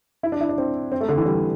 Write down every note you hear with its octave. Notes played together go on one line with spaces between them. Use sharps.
E4
D4
E4
D4
C4
C4
A3
D3
E3
G3